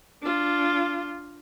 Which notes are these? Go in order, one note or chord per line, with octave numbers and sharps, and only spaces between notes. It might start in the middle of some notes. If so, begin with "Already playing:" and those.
D4 F4